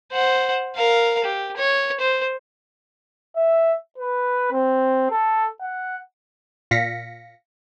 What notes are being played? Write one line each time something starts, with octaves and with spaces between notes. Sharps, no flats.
C5 F#5
A#4 F5
G4
C#5
C5
E5
B4
C4
A4
F#5
A#2 F5 A#6 B6 C#7